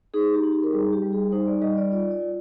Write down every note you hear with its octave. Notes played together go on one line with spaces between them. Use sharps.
D#4 G#4
G4
D#4
G4
A#4
G3 G#4
G4
G3
G#4
D#4 C5
D5
G3 D#5
D5
F4 D5
D5
F4